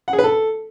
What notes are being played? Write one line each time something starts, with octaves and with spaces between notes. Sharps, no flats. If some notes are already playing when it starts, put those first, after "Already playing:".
F#5
G#4
B4
A4